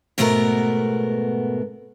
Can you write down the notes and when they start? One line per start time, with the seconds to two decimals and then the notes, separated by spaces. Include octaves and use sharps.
0.18 G#2 B2 A3 B3 E4 A#4